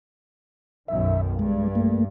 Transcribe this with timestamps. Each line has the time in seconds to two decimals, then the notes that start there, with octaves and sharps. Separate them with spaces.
0.88 B1 F#2 D#3 E5
1.39 G2 G#3
1.75 A3 A#3